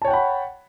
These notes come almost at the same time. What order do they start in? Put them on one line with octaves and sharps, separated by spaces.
A5 C#5 G5 F#5 B5